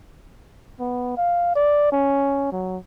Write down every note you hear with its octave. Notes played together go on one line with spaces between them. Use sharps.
B3
F5
D5
C#4
F#3